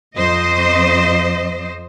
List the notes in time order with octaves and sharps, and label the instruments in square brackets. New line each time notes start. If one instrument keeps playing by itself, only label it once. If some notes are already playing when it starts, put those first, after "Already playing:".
[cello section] F2 C5 D#5